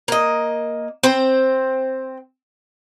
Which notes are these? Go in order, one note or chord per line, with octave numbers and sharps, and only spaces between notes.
A#3 D#5
C4 C5